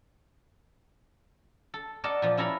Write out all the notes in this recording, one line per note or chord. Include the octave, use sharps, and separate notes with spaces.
A4
A4 A#4 D5 D#5 F#5 A5
A#2 F3
C#4 E4 A4 A#5 B5